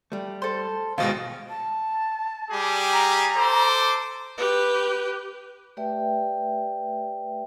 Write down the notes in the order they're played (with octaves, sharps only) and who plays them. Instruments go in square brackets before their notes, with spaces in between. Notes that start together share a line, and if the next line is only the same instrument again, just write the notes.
[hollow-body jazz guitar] G3 A3
[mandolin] A4 C5
[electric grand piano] G#1 B2 G#3 [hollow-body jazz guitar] E2 E3 C5 [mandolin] F4 D#5
[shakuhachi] A5
[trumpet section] G3 G4 G#4
[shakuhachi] A#5
[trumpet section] A4 C5 D6
[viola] G4 B4
[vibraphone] A3 G4 B4 D5 E5 G5